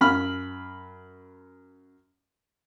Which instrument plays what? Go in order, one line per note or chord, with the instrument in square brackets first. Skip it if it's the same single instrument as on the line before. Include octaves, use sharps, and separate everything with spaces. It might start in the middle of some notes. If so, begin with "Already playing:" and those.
[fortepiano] F#2 B5 F6